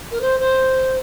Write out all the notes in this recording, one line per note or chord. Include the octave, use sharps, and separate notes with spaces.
A#4
C5
C5